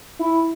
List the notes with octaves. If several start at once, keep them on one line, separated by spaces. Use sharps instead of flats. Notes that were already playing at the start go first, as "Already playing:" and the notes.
E4